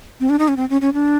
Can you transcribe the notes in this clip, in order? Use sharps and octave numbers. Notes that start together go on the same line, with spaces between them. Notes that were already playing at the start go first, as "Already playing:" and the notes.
C4
D4
D#4
C#4
C4
C#4
C#4
D4